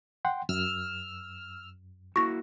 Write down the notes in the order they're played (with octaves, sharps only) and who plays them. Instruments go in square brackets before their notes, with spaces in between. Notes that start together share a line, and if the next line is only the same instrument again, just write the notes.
[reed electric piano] F#5 G5 C6
[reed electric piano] F#2 [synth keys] E6 F6
[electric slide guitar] A#3 E4 F#4 [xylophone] C#6 A#6